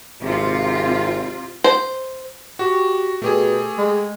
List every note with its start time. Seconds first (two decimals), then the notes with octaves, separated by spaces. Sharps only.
0.22 G#1 C3 F4
1.64 C5
2.59 F#4 G4
3.22 B2 A3 G4 G#4
3.78 G#3